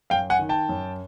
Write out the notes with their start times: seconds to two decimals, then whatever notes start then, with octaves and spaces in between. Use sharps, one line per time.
0.10 F#2 F5 G5
0.30 F#5 G#5
0.39 D#3
0.49 G5 A5
0.69 F#2